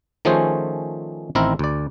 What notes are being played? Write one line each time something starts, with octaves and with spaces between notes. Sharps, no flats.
D#3 F3 A3 C#4 G#4 C5
A1 D#3 C4 E4 A#4
D2 D5